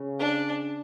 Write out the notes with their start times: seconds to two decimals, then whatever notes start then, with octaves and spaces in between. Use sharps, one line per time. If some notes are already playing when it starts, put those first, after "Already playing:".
Already playing: C#3
0.20 D4